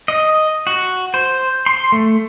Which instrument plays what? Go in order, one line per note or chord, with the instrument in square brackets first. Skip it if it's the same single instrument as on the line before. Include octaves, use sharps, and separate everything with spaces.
[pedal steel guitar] D#5
F#4
C5
C6
A3